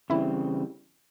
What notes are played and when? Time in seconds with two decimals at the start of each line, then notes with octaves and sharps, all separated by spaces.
0.10 C#3 E3 G3 C4 E4 E5